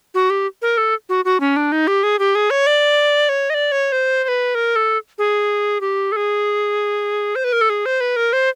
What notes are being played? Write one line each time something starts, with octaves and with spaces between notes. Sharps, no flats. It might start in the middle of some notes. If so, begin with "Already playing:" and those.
F#4
G4
A#4
A4
F#4
F#4
C#4
D4
D#4
G4
G#4
G4
G#4
C#5
D5
C#5
D#5
D5
C#5
C5
C5
B4
A#4
A4
G#4
G4
A4
G#4
C5
B4
A#4
A4
G#4
C5
B4
A#4
C5